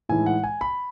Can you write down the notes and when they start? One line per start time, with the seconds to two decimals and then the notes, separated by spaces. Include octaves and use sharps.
0.09 A2 E3 G#3 D#4 G#5
0.26 F#5
0.44 G#5
0.61 B5